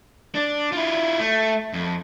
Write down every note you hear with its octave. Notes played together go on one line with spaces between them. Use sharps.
D4
E4 F4
A3
F2